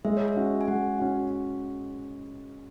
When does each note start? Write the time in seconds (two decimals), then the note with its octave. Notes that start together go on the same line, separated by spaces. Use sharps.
0.05 G#3 E5
0.17 C#5
0.28 E5
0.36 C#4 F#4
0.61 G#5
0.68 G#3 F#5
0.99 C#4 F#4